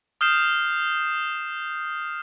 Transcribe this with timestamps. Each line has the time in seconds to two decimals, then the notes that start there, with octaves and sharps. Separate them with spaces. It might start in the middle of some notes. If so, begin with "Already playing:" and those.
0.21 D#6 F6 G6 C7 E7